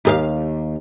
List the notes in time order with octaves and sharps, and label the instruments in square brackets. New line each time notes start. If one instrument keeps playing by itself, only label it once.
[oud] D#2 G#4 F5